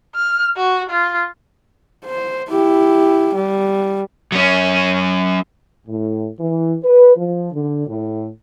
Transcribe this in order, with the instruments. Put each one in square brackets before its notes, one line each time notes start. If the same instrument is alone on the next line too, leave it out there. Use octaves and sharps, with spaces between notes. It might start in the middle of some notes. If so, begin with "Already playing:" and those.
[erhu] F6
F#4
F4
[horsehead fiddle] C5
E4 G4
G3
[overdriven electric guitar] F#3 C#4
[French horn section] A2
E3
B4
F3
D3
A2